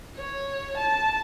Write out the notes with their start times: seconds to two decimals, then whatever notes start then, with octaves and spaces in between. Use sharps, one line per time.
0.17 C#5
0.77 A5